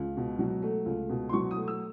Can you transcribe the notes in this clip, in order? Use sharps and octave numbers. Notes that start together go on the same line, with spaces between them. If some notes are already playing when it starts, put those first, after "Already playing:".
Already playing: C#2
B2
F#3
A3
C#2
B2
C6
F#3 C#6
D#6
A3
E6